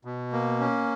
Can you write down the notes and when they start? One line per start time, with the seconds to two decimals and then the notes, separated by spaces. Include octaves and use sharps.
0.05 B2
0.33 A#3
0.60 C#4